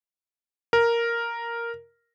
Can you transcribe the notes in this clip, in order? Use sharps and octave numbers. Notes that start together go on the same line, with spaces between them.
A#4